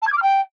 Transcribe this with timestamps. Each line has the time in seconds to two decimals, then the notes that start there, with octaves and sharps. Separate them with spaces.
0.02 A5
0.07 G#6
0.12 D6
0.18 F6
0.23 G5